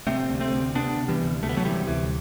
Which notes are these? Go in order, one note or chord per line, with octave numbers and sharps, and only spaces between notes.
C3 A3 C4
D2
A3 C4
D2
C3 B3 D4
C3
E3 G3
D2
D2 A3
B3
F#3 A3
C3 E3 G3
D2 E3